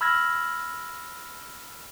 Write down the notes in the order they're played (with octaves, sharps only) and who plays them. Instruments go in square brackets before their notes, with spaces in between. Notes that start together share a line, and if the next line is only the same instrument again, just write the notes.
[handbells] B5 E6 F6 G#6 A#6